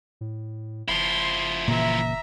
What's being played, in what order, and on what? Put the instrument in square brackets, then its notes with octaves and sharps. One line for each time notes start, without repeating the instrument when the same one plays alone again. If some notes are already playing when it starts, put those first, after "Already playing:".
[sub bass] A2
[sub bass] F#1 [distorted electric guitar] F3 E4 [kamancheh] C6
[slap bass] A#2 C#3 E3 [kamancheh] E5 A#5